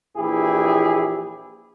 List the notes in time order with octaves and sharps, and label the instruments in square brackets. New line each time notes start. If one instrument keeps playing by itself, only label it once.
[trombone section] A#1 E3 E4 G4 G#4